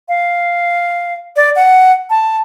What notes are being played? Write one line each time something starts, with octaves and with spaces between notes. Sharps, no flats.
F5
D5
F#5
A5